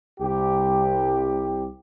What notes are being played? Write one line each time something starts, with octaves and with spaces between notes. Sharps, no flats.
C2 G4